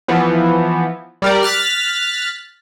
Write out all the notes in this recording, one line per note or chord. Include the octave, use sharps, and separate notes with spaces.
E3 F3 B3
G3 A#4 D5
F6 F#6 A6 B6